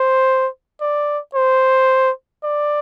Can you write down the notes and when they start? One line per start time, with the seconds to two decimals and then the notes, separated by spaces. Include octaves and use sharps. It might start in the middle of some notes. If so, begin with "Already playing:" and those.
Already playing: C5
0.81 D5
1.35 C5
2.43 D5